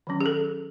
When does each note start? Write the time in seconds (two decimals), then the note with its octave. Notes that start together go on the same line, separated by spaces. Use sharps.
0.07 D#3 F#3 C#4
0.21 G#4
0.26 A4